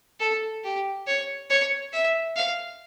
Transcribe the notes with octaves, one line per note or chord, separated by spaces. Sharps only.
A4
G4
C#5
C#5
E5
F5